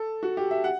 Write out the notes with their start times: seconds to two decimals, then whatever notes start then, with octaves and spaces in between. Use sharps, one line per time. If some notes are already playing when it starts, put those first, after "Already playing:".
Already playing: A4
0.23 F#4
0.37 G4
0.51 E5
0.64 F#5